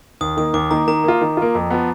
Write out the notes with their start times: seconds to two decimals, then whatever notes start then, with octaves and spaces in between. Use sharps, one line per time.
0.21 D#2 D#6
0.37 D#3 A#3 D#6
0.54 D#2 D6
0.71 D#3 A#3 A#5
0.88 D#3 A#5
1.04 A#3 F4
1.21 D#3
1.37 A#3 F4
1.55 F2
1.71 F3 B3